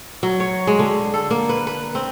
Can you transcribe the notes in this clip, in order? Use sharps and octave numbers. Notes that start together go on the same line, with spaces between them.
F#3
C#5
G#3
D3
A4
A#3
B4
B4
C4